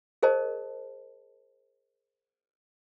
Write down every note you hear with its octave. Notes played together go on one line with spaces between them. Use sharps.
G#4 A#4 C5 D#5 A5